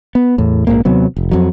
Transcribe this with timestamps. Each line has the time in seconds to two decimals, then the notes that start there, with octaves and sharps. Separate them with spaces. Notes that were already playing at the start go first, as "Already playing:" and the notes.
0.15 B3
0.38 E2 A2
0.67 A#1 E2 G#2 A#3
0.85 D#2 C3 F#3 B3
1.17 F1
1.31 F2 F#3